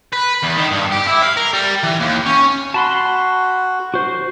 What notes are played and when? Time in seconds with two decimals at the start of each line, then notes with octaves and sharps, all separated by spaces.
0.13 B4
0.43 E2
0.56 D#3
0.71 G2
0.91 G4
1.07 E4
1.23 F5
1.37 A#4
1.54 G3
1.84 E3
2.01 D#2
2.26 C#4
2.74 F#4 A5 B5 C6
3.94 F#4 C5